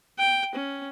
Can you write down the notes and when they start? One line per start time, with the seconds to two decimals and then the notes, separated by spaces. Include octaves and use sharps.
0.18 G5
0.54 C#4